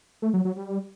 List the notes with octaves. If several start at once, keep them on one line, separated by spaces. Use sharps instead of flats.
A3
F#3
F#3
G3